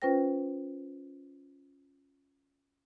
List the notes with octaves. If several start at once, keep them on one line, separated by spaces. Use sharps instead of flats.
C#4 F4 B4 C5 G5 A#6